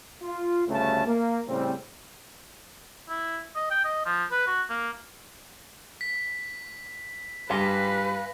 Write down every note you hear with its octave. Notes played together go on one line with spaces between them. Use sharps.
F4
G1 D2 C#3 A3 C#4 A5
A#3
A2 C#3 G3 C4
E4
D#5
G5
D#5
F3
B4
F#4
A#3
B6
G2 G3 B4 F5 G#5 C6 A#6 B6